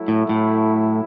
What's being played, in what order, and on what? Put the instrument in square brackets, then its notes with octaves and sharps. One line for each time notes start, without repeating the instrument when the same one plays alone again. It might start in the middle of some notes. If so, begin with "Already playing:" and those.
Already playing: [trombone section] F#3 A3 E4
[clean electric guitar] A2
A2